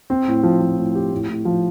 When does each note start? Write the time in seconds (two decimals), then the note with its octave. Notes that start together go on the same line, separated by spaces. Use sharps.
0.10 C4
0.28 A2
0.43 F3
0.61 F3
0.78 A2
0.95 G4
1.12 A2
1.29 A2
1.45 F3